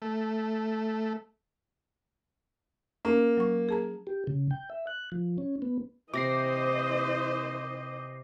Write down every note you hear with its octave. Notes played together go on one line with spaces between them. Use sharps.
A3
A#3 C#4
F#3 C#6
G#4 A5 A#5
G4
C#3
G5
E5
F#6
F3
C#4
B3
C3 E3 C5 D#5 D6 A#6 C7